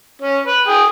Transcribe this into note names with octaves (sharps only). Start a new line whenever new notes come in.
C#4
B4
G#4 G5